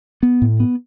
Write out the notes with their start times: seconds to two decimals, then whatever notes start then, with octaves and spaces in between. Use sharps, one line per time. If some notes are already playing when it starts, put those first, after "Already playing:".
0.23 B3
0.42 A2
0.60 B3